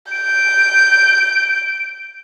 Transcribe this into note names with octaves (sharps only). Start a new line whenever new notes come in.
G6 D7